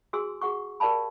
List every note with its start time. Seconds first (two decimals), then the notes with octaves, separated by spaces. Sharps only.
0.13 F#4 G#4 G#5 C6 E6
0.41 F#4 G#4 F#5 C#6
0.80 G4 A#4 D5 F5 A5 B5